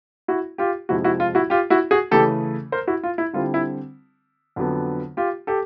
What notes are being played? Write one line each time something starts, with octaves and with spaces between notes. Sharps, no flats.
E4 F#4
F4 G4
F2 C3 F3 G#3 E4 F#4
E4 F#4
F4
E4 F#4
F4 G4
E4 F#4
F#4 G#4
C#3 E3 A3 C#4 G4 A4
A#4 C5
E4 F#4
F4
E4
D3 G3 C4 E4 F4
E4
F2 D3 F#3 B3
F4 G4
G4 A4